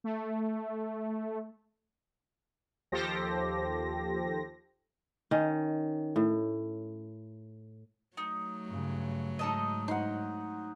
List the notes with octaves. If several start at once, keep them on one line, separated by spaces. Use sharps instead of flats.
A3
D#2 F3 G4 A4 C5 A#6
D#3 C#4
A2
F#3 A3 D#4
G2 C#3
G#2 D#4 A4 D#5
D#4 F#5 C6